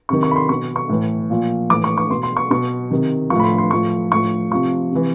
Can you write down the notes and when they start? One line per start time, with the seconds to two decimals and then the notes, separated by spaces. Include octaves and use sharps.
0.09 C3 D#3 C#6
0.23 C#6
0.31 B5
0.36 C6
0.49 B2 C#6
0.76 C#6
0.89 A2 E3
1.30 A#2 F3
1.70 A2 E3 D6
1.84 C#6
1.98 C#6
2.11 B2 C6
2.23 C6
2.37 C#6
2.51 B2 C#6
2.91 C3 D#3
3.30 F3 C#6
3.35 A2 B5
3.44 C6
3.58 C6
3.71 A2 F3 C#6
4.12 A2 F3 C#6
4.51 C3 F3 C#6
4.91 C3 E3